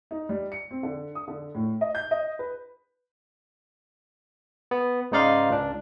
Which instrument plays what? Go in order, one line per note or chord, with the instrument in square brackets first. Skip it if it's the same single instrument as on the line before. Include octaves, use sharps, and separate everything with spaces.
[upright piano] D#4
G3
C#7
C4
D3
D#6
D3
A2
D#5
G6
D#5
B4
[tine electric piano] B3
G#2 C#3 D#4 D5 F5 C6
C#2 D4